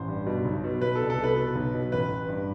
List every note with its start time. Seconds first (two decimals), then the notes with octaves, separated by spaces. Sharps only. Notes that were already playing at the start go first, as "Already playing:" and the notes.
Already playing: A1 C5
0.08 G2
0.26 B2
0.45 B1
0.64 B2
0.81 B2 B4
0.96 C2 A4
1.10 A4
1.19 B2 B4
1.36 B2
1.55 B1
1.74 B2
1.92 A1 B4
2.10 A1
2.28 G2